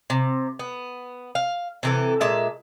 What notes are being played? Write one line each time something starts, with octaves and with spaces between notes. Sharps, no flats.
C3
B3
F5
C3 E3 A4
A#2 G#3 E5 A5